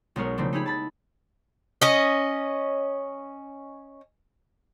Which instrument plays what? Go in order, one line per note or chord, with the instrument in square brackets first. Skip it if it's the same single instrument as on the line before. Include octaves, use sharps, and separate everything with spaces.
[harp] B1 G#3 A#4 C#5
C#3 F3 A3 C4 D4
D#4 E4 G4 G#4 B5
A5 B5 A6
[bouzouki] C#4 D#5